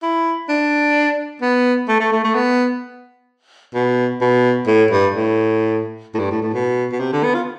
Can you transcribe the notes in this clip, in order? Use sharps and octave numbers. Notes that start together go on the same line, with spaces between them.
E4
D4
B3
A3
A3
A3
A3
B3
B2
B2
A2
G2
A2
A2
G2
A2
A2
B2
B2
C3
D3
B3
F4